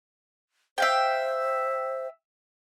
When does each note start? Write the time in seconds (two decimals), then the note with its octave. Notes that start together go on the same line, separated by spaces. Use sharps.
0.78 C5 E5 F5 G5